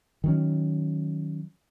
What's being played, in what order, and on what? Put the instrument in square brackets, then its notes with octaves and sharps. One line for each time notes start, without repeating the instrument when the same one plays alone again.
[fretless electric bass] D#3 F#3 C#4